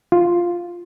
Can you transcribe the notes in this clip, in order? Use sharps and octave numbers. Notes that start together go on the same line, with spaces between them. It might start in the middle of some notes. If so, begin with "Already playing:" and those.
F4